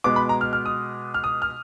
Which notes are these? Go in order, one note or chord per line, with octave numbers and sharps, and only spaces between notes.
B2 G#3 B3 D6
B5
A#5
F6
F6
D#6
F6
D#6
F6